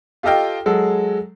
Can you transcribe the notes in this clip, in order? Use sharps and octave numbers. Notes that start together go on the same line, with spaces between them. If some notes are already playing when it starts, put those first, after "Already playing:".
F4 G4 A4 D#5 F5 G5
F#3 G#3 A4